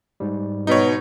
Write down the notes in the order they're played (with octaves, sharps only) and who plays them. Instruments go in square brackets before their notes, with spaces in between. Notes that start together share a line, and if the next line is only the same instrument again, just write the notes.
[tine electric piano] G#2 G3
[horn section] B2 [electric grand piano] D#4 C#5